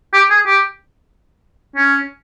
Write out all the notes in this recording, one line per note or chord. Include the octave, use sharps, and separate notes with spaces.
G4
G#4
G4
C#4